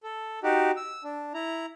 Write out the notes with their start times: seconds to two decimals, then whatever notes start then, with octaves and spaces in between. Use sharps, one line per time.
0.03 A4
0.43 D#4 F#4 G4
0.77 E6
1.04 D4
1.34 E4 A#5